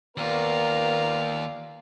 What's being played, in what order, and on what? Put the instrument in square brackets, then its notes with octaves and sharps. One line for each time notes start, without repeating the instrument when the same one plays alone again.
[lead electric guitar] D#2 [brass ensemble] B3 A#4 [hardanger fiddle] F4 D5